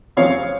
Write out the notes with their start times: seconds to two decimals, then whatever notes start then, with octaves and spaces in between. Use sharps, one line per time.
0.17 F2 C#3 F3 C4 C#5 F5